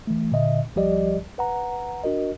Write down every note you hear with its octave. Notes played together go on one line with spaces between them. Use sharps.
E3 A3
A#2 D3 D#5 E5
C2 F3 G3 G4 D5 D#5
B4 F#5 A#5
D4 F#4 A#4 D#5